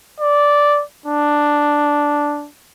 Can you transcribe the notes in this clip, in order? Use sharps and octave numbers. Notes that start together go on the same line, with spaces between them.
D5
D4